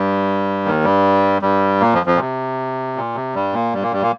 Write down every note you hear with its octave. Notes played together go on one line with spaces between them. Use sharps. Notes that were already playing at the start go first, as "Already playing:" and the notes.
Already playing: G2 G3
D#2 D#3
G2 G3
G2 G3
A#2 A#3
F2 F3
F2 F3
A#2
C3
A#2
C3
G2 G3
A#2 A#3
G2 G3
A#2 A#3
G2 G3
A#2 A#3